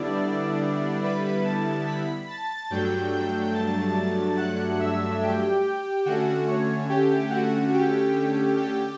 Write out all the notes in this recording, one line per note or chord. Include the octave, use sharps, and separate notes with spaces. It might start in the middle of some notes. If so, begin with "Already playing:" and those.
Already playing: D3 G3 B3 D4 E4 D5
B4 B5
A5 A6
B5 B6
A5 A6
G2 F#3 A3 D4 G5 G6
G5 G6
A5 A6
F#5 F#6
E5 E6
G4 G5
D3 A3 C#4 F#4 F#5
C#5
G4 G5
F#4 F#5
G4 G5
G4 G5